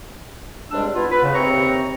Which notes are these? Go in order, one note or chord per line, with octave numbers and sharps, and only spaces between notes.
C#2 C3 G3 G#3 D4 E6
B3 E4 F4
B4
C#3
D#2 C3 C4 C#5 A#5 C#6